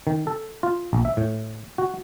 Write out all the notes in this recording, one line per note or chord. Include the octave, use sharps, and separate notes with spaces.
D#3
A4
F4
A#1
E5
A2
F#4